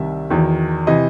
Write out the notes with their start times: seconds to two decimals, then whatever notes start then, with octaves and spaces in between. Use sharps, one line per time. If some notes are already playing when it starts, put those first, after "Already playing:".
Already playing: C2 C3 D#3 E5
0.30 E2 D#3 F#3
0.87 C3 E3 D#5